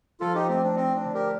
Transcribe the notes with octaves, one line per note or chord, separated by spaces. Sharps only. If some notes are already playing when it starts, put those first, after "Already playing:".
F3 F4 A4
D#4 G4
A3 C4
D4
C4 D#4
D4
D3
G4 A#4